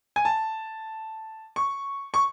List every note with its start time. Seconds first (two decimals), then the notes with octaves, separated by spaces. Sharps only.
0.16 G#5
0.25 A5
1.56 C#6
2.14 C#6